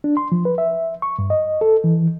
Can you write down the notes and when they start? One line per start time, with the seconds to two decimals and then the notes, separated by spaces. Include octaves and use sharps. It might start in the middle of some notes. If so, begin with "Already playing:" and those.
0.04 D4
0.17 C6
0.32 F3
0.45 B4
0.58 E5
1.02 C#6
1.19 G2
1.30 D#5
1.61 A4
1.84 E3